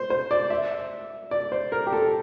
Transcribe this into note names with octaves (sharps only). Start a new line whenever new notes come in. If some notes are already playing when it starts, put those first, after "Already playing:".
Already playing: C5
C5
D5
E5
D5
C5
A#4
G4
A4